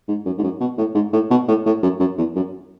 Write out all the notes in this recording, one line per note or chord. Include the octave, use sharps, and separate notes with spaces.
G#2
F#2
G#2
F#2
B2
A2
G#2
A2
B2
A2
A2
F#2
F#2
E2
F#2